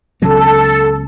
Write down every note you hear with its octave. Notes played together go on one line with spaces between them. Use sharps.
C#2 C#3 F#3 B3 A4